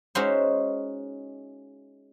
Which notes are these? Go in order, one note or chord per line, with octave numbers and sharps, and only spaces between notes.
G#3 C#4 D#4 F#4 C5 E5